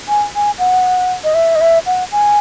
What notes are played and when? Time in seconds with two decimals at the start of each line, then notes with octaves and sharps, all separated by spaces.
0.08 G#5
0.36 G#5
0.59 F#5
1.24 D#5
1.35 E5
1.56 D#5
1.61 E5
1.86 F#5
2.12 G#5